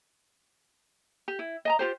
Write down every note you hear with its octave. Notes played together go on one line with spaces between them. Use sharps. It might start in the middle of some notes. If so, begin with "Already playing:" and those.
G4
E4
D#5 A5 A#5
F4 G4 C5